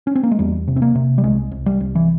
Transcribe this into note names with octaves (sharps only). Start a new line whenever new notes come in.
C#4
C4
A#3
G#3
E2 G3
C3
C4
A#3
C3
G3
C2 G#3
C2
G3
C2
E3